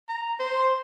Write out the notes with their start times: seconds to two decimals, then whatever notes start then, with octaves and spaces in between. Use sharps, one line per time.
0.09 A#5
0.39 C5